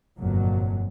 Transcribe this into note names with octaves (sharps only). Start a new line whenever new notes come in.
G1 F2 A#2 F#3